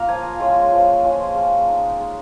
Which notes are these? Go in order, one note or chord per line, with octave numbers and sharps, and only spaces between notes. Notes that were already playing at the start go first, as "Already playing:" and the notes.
Already playing: A#3 F4 F5 A#5
F3 G#5
G#3 C#4 F4
F3
G#3 C#4 F4
G#3
D#4
G#3